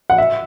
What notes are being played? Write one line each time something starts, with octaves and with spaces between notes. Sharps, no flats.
F#5
E5